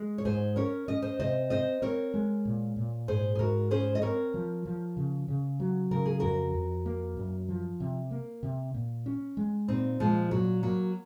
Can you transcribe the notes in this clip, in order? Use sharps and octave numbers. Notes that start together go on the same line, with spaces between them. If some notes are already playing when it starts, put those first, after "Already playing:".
Already playing: G#3
C#5
G#2 G#4 C5
C#4 A#4 C#5
C#4 D#5
C5 D#5
C3 C5 D#5
C4 C5 D#5
C4 A#4 C#5
G#3
A#2
A#2
G#2 G#4 C5
G#4
G#2 F#4 A#4
C#4 G#4 C5
D#5
C4 A#4 C#5
F3
F3
C#3
C#3
F#3
C#3 A#4
G#4
F2 F#4 A#4
F2
A#3
F#2
F3
C3
A#3
C3
A#2
C#4
G#3
A#2 C4 D#4
A#2 F3 G#3
A#2 F#3
F#3 A#3